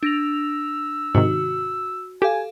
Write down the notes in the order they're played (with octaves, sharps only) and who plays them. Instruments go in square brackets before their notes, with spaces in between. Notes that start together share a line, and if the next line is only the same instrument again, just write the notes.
[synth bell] D4 A#6 F7 [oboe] E6
[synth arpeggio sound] G#2 C3 D#3 [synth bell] F#4
[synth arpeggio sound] G4 [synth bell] A4 F5 [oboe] G#5